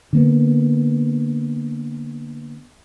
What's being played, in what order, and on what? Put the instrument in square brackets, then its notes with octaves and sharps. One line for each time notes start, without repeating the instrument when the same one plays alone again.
[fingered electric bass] D3 A#3 B3